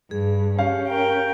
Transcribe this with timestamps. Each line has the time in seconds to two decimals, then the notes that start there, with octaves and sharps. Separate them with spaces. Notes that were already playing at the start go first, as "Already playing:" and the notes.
0.11 G2 G#4
0.59 C#4 G4 F5
0.88 A#4 G5